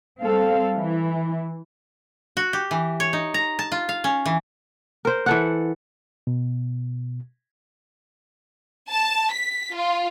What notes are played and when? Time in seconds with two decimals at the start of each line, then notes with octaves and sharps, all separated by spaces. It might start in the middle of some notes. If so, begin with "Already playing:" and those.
0.21 G3 C4 A4 F5
0.76 E3
2.37 F#4
2.53 G4
2.71 E3
3.00 C#5
3.13 D#4
3.34 A#5
3.59 A5
3.72 F4
3.89 F5
4.04 C#4
4.26 E3
5.05 A#4 C5
5.26 E3 A4 F#5
6.27 B2
8.90 A5
9.32 B6
9.74 F4